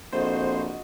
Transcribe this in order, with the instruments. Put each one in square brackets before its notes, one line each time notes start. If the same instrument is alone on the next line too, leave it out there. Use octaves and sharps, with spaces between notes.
[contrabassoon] A#1 [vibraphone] C4 A4 [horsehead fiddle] F#4 D#5 [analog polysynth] C5